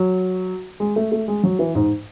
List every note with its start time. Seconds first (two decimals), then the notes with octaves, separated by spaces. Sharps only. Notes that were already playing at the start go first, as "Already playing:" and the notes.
Already playing: F#3
0.80 G#3
0.96 A3
1.12 A3
1.28 G#3
1.43 F#3
1.59 E3
1.75 G#2